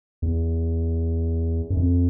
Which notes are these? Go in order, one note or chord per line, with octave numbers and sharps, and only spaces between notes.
E2
F#2
F2